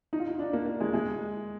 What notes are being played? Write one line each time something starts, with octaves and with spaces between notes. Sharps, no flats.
D#4
F4
D#4
D4
A#3
A#3
G#3
G#3